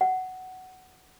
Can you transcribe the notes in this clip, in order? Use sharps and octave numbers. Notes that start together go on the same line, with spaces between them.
F#5